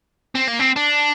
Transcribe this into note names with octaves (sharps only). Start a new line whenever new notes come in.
C4
A#3
C4
D4